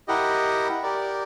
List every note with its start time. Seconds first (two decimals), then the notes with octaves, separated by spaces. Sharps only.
0.08 E4 G4 A#4 D#5 F#5
0.83 G4 A#4 D5